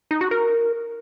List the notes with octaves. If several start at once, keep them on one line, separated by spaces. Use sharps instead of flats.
D#4
F#4
A#4